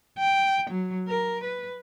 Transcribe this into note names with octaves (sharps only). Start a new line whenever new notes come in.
G5
F#3
A#4
B4